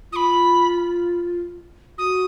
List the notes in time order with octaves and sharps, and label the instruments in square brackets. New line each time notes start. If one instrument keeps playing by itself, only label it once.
[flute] F4 [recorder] D#6
[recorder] B5
[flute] F#4 [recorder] D#6